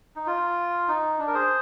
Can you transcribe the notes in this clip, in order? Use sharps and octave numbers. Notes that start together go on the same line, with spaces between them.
D#4
F4
D#4
D4
A#4
G#4 C5